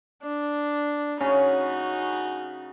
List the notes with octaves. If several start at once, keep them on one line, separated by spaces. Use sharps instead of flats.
D4
C#3 C#4 D#4 F#4